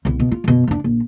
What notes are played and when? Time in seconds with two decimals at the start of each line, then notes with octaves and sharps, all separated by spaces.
0.05 C2 B2
0.20 B2
0.32 F4
0.44 F#2 B2
0.68 F1 D4
0.84 A#1